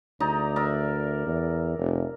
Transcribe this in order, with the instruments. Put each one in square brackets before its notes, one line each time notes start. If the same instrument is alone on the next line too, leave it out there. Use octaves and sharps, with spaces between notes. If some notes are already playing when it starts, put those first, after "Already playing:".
[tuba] D2 [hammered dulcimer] D#4 D5 A#5
[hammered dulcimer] A#4 D5 E5
[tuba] E2
F1